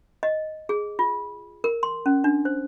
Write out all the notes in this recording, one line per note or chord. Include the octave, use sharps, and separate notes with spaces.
D#5
G#4
F4
A#4
C6
C#4
D4
C5